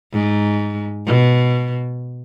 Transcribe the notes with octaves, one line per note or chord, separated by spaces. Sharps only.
G#2
B2